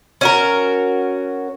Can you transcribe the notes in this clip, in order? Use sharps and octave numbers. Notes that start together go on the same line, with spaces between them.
C#4 F#4 A#4